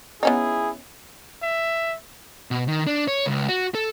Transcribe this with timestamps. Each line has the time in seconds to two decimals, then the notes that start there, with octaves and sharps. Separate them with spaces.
0.23 B3 C#4 D#4 E4 G#4
1.42 E5
2.51 B2
2.68 D#3
2.87 D4
3.08 C#5
3.26 C#2
3.49 F#4
3.75 A4